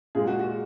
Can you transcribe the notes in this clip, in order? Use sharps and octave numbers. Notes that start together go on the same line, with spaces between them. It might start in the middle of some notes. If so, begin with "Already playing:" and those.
A#2 G#3 G#4
F#4
F#4